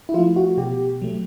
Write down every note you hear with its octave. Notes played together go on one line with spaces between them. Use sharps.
E4
F3 A3 F4
F#4
B2 G4
F#3 A3